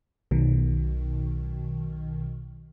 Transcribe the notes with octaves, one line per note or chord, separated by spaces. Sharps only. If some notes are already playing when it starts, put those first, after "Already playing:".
B1 B2 D#3